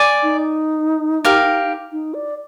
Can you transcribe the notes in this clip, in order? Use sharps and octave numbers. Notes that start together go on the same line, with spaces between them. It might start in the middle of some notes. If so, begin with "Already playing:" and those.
Already playing: D5 G#5 D6
D#4
G4 A#4 F5 C6
D#4
D5